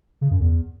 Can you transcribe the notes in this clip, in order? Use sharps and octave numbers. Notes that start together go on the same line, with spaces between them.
C#3
F#2
E2